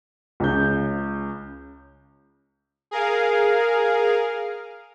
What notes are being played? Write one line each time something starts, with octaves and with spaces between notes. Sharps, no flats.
C#2 C#3 G6
G#4 A#4 F5